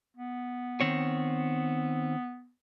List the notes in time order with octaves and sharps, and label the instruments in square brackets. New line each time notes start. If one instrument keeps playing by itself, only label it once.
[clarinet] B3
[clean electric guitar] D#3 C4 C#5